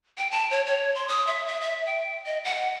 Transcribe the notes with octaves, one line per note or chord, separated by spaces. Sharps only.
G5
A5
C#5
C#5
C6
D#6
E5
E5
E5
G5
D#5
F#5